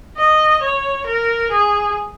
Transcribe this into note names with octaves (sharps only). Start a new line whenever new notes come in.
D#5
C#5
A#4
G#4